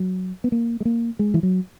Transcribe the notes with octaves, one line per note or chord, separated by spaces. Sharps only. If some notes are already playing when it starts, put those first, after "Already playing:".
Already playing: F#3
B3
A#3
G#3
A#3
G#3
E3
F#3